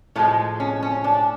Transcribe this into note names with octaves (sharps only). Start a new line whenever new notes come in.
A2 F3 G#3 A3
C#4
C#4
D4